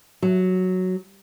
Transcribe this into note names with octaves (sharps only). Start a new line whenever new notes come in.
F#3